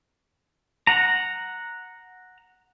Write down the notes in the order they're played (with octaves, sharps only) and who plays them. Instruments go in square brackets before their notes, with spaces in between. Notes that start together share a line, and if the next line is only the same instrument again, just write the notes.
[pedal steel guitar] F#5 A#5